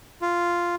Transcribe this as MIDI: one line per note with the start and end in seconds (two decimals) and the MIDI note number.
0.22 0.76 65